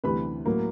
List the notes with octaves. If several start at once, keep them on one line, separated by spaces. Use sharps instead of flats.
D2 C3 E3 G3 B4 B5
A2 F#3 A#3